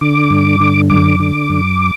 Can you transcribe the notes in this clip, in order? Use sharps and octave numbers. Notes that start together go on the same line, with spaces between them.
D3 D6
G2
D3
F#2 D6
D3
F#2